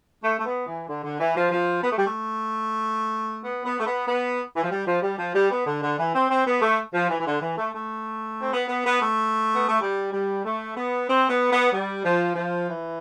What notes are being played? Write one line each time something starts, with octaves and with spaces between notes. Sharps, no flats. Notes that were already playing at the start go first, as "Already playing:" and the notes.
A3
A3
B3
E3
D3
D3
E3
F3
F3
B3
A3
G3
A3
B3
B3
A3
B3
B3
E3
F3
G3
F3
G3
F3
G3
B3
D3
D3
E3
C4
C4
B3
A3
F3
E3
E3
D3
E3
A3
A3
C4
B3
B3
B3
A3
B3
A3
G3
G3
A3
B3
C4
B3
B3
G3
F3
F3
E3